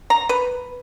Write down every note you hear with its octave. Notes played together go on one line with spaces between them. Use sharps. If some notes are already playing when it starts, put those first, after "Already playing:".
A#5
B4